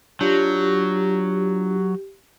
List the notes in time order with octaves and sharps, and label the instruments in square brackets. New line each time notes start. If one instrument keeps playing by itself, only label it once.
[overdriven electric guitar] F#3 [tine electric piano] D4 F4 [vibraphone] G4